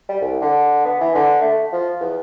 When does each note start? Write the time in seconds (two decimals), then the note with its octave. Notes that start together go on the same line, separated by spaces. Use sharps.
0.09 G3
0.21 C2
0.42 D3
0.85 B3
1.01 E3
1.15 D3
1.41 A3
1.73 F3
2.00 E2